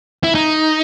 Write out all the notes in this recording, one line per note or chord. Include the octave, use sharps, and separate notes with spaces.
E4
D#4